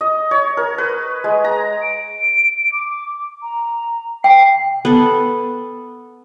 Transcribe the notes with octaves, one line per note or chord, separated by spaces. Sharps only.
D#5
C#5
A#4
B4
G#3
A#5
D7
D6
A#5
G5 C7
B3 A4